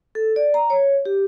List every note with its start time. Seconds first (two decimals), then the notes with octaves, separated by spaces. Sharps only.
0.15 A4
0.36 D5
0.54 A#5
0.70 C#5
1.05 G4